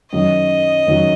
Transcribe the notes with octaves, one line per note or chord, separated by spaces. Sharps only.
F#2 D#3 F#3 D#5
F#2 D#3 F#3